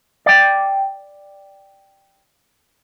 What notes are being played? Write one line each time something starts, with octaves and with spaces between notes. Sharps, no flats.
D5 G5